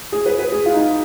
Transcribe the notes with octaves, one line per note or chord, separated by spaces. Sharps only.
G#4
B4
B4
G#4
F4
D#4
F4